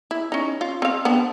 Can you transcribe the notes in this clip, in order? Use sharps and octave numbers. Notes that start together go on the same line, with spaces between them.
E4
C#4 D#4
F4
C4 F5
B3 C4 D4